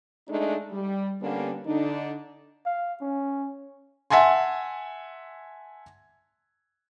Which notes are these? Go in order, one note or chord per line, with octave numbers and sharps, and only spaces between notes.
G#3 A3 D4 D#4
G3
D3 G3 A#3 B3 C#4 D4
D3 D4 D#4
F5
C#4
E5 F#5 G#5 A5 C6